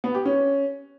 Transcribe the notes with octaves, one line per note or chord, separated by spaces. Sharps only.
B3
G4
C#4